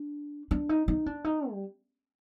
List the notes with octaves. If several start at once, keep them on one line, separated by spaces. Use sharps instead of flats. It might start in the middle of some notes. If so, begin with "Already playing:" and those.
Already playing: D4
D4
D#4
D#4
D4
D#4
G3